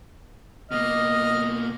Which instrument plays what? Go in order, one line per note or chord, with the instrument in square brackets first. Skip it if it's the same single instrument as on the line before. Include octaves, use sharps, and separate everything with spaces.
[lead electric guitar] B2 A#3 [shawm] D#5 [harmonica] F6